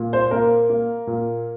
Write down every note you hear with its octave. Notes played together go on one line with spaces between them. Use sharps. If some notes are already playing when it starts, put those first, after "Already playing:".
Already playing: A#2
C5
A#3 A#4
A#3
A#2